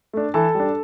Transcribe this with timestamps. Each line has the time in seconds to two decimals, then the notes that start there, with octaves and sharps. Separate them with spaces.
0.13 A3 D4
0.34 E3 A4 A5
0.55 G3 D4